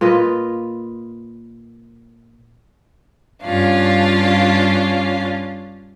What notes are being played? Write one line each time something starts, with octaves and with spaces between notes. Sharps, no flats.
A#2 F4 B4 D#5
G2 C#4 D4 F4 F5